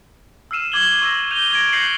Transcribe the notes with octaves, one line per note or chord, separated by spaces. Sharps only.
E6 F6 C7 D#7 E7
C#6 D6 G#6 E7 F#7 G7
C#6 E6 A#6 F#7
G6 D#7 F7 G7
G#6 A#6 D7
F#6 G6 A#6 C7 C#7 F#7